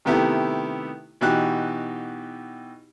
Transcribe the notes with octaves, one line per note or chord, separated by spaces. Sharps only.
C3 D#3 A3 B3 E4 G4
B2 E3 D#4 F#4 G4 F#6